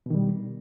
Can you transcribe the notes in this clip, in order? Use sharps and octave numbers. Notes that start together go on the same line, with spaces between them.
B2 D#3 G3